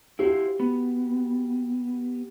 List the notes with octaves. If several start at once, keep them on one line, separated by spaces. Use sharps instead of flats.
E4 F#4 G4 C5 F5
B3